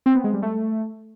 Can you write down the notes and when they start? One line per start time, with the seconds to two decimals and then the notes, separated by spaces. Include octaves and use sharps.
0.06 C4
0.15 B3
0.24 G#3
0.33 G3
0.42 A3